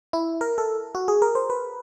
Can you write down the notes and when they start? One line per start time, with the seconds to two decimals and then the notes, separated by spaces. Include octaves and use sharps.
0.13 E4
0.41 A#4
0.58 A4
0.95 F#4
1.08 G#4
1.22 A#4
1.35 C5
1.50 B4